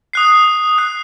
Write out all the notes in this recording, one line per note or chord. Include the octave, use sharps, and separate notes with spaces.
D#6 F#6 C7
D#6 F#6 C7